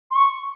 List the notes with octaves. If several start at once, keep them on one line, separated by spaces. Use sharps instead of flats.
C6
C#6